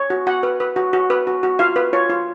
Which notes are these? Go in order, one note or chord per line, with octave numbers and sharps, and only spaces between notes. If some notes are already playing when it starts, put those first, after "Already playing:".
Already playing: C#5
F#4
F#4 F#5
B4
B4
F#4
F#4
B4
F#4
F#4
F4 F5
B4
F4 C#5
F4